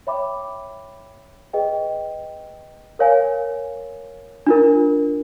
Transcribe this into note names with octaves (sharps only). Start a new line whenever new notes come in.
C#5 E5 G5 B5 D6
G#4 B4 D#5 G5
A#4 C#5 F5 G#5
D4 F4 A#4